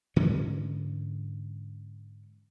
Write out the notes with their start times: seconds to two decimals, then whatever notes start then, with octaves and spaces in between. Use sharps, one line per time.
0.16 G#2 D3 E3 C#4